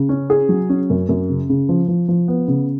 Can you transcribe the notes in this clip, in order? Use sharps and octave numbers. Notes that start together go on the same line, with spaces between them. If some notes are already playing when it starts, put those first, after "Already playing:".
Already playing: C#3
C#4
G#4
F#3
C#4
F#2
F#2
C#3
C#3
F3
F3
F3
B3
C#3